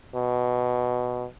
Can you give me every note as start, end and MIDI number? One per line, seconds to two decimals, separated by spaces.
0.15 1.27 47